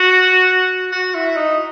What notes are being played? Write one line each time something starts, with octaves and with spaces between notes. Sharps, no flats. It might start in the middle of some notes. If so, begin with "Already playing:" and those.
Already playing: F#4
F#4
E4
D#4